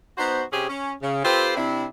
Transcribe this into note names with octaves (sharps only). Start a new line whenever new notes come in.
B3 D#4 F#4 C5
C3 C4 C#4 G4 G#4
C#4
C#3
C4 F4 G4 A4 B4 C5
C3 C4 D4 E4